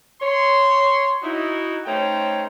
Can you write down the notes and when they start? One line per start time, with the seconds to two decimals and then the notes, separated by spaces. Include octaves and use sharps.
0.22 C#5 C6
1.23 D#4 E4 F#4
1.86 A3 C#4 D#4 C5 C#5 G5